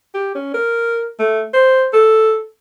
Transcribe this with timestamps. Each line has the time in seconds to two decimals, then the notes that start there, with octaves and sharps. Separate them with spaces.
0.14 G4
0.35 C#4
0.54 A#4
1.19 A3
1.54 C5
1.93 A4